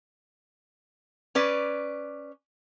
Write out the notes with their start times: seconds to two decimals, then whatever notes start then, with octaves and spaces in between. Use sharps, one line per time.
1.35 C#4 B4 D5